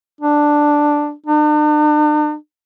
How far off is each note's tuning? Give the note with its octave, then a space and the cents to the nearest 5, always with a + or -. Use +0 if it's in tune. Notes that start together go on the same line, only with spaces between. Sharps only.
D4 +5
D4 +45